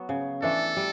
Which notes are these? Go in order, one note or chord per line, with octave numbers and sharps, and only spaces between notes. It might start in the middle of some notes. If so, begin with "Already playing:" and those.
Already playing: F#3 B3 F#4
C#3
E3 A3 D4 A4
G3